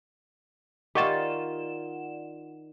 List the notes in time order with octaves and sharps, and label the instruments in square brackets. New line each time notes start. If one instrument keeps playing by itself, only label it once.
[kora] D#3 F4 [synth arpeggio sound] G4 C#6 A6 [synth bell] D5 F#5 E7